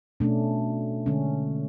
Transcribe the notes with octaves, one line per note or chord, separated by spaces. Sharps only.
B2 A3 C#4 D4
D3 G#3 C#4